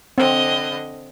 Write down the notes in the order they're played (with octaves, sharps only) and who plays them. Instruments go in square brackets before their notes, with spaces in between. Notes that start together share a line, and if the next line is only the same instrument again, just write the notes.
[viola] D3 D#5 [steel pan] C4